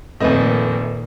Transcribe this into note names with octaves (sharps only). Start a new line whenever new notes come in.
F1 A#2 D#3 A3 C4 B4 D#5